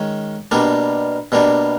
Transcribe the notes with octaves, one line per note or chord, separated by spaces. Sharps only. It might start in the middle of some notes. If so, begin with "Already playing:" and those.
Already playing: D#3 G#3 C#4
B2 G3 A#3 D4
B2 G3 A#3 D4